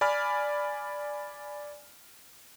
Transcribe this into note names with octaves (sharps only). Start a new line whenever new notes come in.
D5 G#5 B5 F6